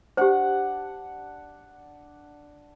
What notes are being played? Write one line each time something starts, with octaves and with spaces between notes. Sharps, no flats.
D4 G4 C5 F#5